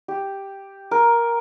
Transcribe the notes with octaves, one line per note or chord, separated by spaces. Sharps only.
G4
A#4